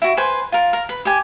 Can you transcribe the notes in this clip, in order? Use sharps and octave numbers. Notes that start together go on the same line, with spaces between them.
E4 F#4
B4 C5 G#5
F4 A#4
A#4
B4
G4 G#5